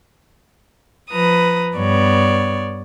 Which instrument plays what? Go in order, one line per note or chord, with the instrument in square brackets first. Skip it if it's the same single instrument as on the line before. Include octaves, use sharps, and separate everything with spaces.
[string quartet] F3 B4 A#5 D#6
G2 B3 C#5 D5